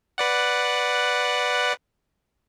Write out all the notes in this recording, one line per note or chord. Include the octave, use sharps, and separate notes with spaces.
B4 D5 F#5